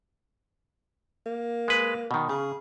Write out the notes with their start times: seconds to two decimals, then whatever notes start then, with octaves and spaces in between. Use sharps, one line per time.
1.26 A#3
1.68 G#3 B4
2.11 B2 D#3
2.29 C#3 G#4